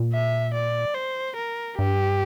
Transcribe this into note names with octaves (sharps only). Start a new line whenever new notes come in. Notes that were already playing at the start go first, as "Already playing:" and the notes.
Already playing: A#2
E5
D5
C5
A#4
G2 G4